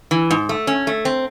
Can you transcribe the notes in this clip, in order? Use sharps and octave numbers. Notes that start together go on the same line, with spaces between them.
E3
G#2
A3
C#4
A3
C4